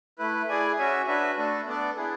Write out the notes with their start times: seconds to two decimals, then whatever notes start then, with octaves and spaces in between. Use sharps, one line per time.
0.19 A3 E4 B4
0.48 E4 G#4 D5 G#5
0.78 C#4 F#4 C#5 E5 G#5
1.07 D4 F#4 B4 E5
1.37 A3 D4 A4
1.66 B3 D4 A4 D5
1.97 B3 E4 G#4